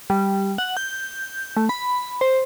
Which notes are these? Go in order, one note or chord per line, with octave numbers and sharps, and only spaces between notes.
G3
F#5
G6
A3
B5
C5